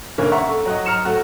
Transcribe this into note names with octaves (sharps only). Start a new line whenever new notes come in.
F1 D3 A#3 C#4
E5 F#5 A#5 C#6
A4
F#3 F#4 D#5
A#5 F6 C#7 E7
F#3 A3 F#4